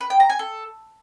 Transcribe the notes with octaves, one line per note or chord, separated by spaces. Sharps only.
B4
G5
A#5
G#5
A4